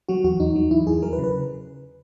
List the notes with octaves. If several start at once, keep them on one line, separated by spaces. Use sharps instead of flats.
F#3 F#4
E2 F#4
E2 D#4
F#3
E2 E4
E2 G#4
F#3 A#4
B4
C#3
B4